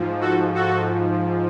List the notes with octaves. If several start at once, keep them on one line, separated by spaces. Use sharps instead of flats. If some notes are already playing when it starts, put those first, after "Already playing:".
Already playing: G#2 F3
F#4 A4
F#4 A4